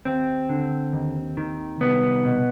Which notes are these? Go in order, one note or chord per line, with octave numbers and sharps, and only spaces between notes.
D#2 C4
D3
D#2
D#3
C2 B3
B2